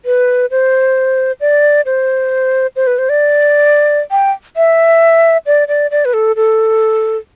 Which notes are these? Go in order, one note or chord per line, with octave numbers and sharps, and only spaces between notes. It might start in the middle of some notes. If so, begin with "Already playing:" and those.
B4
C5
D5
C5
C5
B4
C5
D5
G5
E5
D5
D5
D5
B4
A4
A4